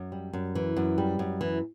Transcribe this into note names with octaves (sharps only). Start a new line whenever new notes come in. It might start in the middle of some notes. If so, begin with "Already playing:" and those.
Already playing: F#2
G3
F#2
E3
F#2
G3
F#2
E3